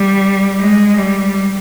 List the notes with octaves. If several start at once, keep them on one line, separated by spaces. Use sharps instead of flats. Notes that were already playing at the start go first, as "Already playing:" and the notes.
Already playing: G3
G#3
G3